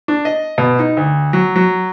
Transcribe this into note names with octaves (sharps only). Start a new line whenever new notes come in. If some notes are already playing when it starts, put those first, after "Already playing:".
D4
D#5
B2
D#4
D2
F#3
F#3